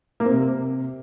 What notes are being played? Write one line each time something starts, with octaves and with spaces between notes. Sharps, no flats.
A#3
C4
C3